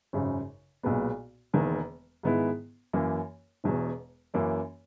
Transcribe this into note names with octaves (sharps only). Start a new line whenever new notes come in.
G#1 F#2 C#3
B1 A#2 G#3 B3
E1 E2 D#3 A#3
G#2 D#3 G#3 B3 E4
F#2 E3 A#3
E1 E2 B2
F#2 E3 A#3 C#4